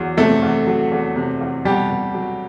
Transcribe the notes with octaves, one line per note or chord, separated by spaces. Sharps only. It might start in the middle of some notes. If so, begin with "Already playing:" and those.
Already playing: E2 F#3
C3 A3 A4
E2
F#3
E2
C3
E2
B2 G3 G4
B2
F#3